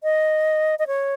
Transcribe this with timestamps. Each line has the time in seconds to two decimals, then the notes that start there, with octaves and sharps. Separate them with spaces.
0.03 D#5
0.79 D#5
0.87 C#5